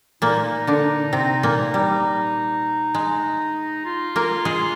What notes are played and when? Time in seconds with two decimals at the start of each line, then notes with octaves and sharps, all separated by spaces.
0.22 A#2 A#3 D#4
0.67 D3 D4
1.13 C3 C4
1.43 A#2 A#3
1.74 G3
2.95 G#3
3.85 F4
4.16 A#3 A#4
4.45 G#3 G#4